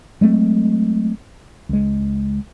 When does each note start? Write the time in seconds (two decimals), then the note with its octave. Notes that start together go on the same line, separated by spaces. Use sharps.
0.21 F#3 G#3 A3 C4
1.69 C#2 G#3